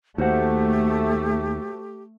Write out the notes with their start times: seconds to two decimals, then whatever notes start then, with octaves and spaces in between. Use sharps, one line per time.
0.18 D#2 A3 F#4 G4 C5 F#5